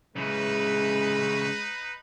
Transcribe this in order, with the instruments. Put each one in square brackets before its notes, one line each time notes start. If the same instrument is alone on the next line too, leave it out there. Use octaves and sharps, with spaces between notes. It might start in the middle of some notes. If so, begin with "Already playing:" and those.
[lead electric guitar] C#3 E3 [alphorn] G#3 [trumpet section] D#4 B4